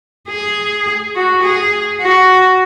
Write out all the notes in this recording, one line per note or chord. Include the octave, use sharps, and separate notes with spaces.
G#4
F#4
G#4
F#4